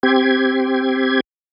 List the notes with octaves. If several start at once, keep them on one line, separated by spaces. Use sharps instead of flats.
C4 G4 G#6